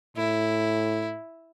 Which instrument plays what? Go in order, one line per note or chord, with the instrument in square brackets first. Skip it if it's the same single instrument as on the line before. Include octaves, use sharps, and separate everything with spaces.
[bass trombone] A2 [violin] E4